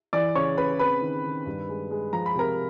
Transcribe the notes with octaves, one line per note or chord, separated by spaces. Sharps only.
E3 D5 D6
C#3 C#5 C#6
C#3 B4 B5
C4 B4 B5
D#3
D#3
G2
G#3
G#3
F3 A#5
B5
C3 A#4 A#5